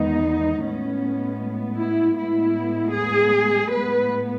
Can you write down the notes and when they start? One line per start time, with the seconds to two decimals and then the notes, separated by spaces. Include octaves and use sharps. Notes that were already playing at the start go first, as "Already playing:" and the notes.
Already playing: E2 D#3 G#3 B3 D#4
0.64 A2 G#3 B3 C#4
1.79 E4
2.18 A2 G#3 B3 E4
2.95 G#4
3.72 A2 G#3 B3 B4